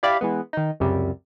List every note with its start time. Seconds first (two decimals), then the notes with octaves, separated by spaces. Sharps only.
0.03 E4 G4 D5 F5 B5
0.21 E3 G#3 B3
0.53 D#3 D#4
0.80 C#2 F#2 C3 G3